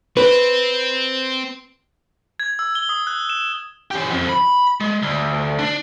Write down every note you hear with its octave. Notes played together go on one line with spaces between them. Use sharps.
C4 B4
G#6
E6
G7
D#6
F#6
E7
C#4 G4
F2 F3
B5
G#3
D2
D4